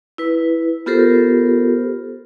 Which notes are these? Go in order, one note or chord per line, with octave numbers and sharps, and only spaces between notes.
E4 B4
B3 F4 G4 A4 A#4 C5